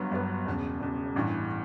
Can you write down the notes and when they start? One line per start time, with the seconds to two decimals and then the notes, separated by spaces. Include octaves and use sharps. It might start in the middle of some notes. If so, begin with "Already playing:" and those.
Already playing: G1 G2 F#3 B3
0.11 G1 G2 F#3 B3
0.46 E1 E2 C#3
0.80 E1 E2 C#3
1.16 A1 G2 E3